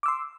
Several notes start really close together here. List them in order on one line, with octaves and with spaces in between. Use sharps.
D6 E6 C6